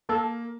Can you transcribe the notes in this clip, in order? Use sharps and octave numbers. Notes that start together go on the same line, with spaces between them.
A#3 A4